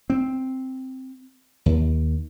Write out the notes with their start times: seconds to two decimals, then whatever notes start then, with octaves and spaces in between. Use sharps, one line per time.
0.10 C4
1.66 D#2